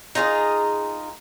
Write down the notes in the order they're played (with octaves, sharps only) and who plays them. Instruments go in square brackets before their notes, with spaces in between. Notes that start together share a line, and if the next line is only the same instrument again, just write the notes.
[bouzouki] D#4 F4 G#4 A#4